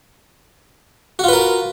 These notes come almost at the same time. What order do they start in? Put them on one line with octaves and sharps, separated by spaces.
F#4 F4 B4 A#4